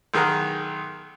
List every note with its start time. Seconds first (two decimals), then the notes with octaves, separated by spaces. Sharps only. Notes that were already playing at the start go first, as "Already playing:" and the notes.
0.14 B1 D#3 G#4 A#4 F#5 F6